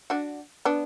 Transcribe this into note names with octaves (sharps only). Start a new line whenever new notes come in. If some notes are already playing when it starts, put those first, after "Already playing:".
D4 F#4
B3 D4